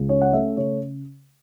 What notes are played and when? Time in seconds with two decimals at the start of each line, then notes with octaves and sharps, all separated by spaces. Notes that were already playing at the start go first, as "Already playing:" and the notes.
Already playing: C#2
0.09 C#4 C#5
0.21 F#5
0.33 A3 E5
0.57 C#3 C#5